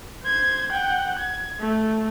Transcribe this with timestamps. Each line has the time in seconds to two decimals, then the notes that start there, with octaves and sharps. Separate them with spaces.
0.22 C5 G#6
0.72 F#5 G5
1.19 G#6
1.60 A3